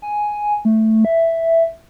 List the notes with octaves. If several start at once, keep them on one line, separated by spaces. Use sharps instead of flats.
G#5
A3
E5